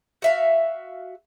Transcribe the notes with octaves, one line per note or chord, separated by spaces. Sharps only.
F#4 E5 F5